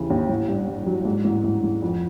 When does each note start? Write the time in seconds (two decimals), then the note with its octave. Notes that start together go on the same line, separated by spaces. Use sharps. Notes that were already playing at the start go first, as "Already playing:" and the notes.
Already playing: D#2 C#3 E3
0.10 D#2
0.29 A1
0.49 G2
0.68 G2
0.86 F#3
1.05 G#2
1.25 A1
1.44 A1
1.63 A1
1.82 F2